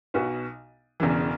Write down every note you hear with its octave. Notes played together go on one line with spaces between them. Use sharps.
B1 B2 B3 F#4
E1 E2 C#3 E3